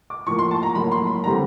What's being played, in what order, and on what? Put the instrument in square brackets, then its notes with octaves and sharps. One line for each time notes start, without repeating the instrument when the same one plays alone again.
[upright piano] D6
A2 F3 A#3 C#6
C6
A5
A#5
A2 F#3 A#3 B5
C6
B5
D3 G3 C4 A#5